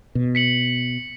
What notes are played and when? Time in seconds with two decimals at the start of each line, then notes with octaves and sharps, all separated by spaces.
0.15 B2
0.35 B6 C#7 F#7